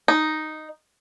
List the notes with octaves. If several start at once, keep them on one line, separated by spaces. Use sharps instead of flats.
D#4